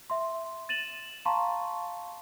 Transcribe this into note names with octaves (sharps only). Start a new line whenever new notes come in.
E5 C6
A6 D#7 E7 F#7
F5 A5 A#5 C6 C#6